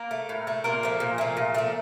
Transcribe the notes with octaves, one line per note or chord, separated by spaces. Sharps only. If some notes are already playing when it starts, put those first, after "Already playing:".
Already playing: A#3 A#4
A3
A2
A3
A#2 A#3 A#4
F3 A3
A#2
F3 A3
A#2
F3 A3